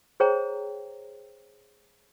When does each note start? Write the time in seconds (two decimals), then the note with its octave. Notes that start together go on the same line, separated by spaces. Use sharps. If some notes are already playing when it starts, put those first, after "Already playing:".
0.20 G#4 C5 C#5 G5 A#5